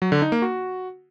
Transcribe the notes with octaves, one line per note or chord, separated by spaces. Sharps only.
F#3
D3
D#4
A#3
F#4